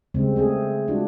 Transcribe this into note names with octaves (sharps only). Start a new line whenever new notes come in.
C#3 G3 G#3 C4
A3 C4 G#4
G#3 D4 F4 F#4